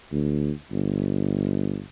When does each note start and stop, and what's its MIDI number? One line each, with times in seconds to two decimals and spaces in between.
0.11 0.51 38
0.72 1.80 31